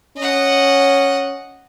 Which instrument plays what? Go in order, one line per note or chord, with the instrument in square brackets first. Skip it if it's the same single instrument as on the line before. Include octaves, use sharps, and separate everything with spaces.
[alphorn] C#4 [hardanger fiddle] D#5 F#5